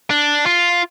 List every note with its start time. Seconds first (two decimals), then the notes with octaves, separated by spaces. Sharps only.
0.10 D4
0.46 F4